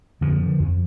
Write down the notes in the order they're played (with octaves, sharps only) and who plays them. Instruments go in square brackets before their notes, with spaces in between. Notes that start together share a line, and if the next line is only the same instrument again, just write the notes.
[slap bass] F2 D3 F3
D3
F2